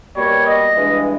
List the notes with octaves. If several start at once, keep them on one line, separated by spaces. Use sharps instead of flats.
B2 G3 A#3 C#5
D#5
G2 E3 G#3